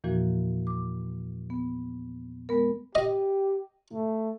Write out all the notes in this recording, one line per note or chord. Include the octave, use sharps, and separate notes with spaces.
E2 A#2 E3 F3 A#3 F#4
D6
B3
G#3 B3 A#4
G4 D#5
A3